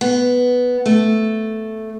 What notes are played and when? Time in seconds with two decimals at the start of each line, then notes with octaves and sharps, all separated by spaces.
0.01 B3
0.86 A3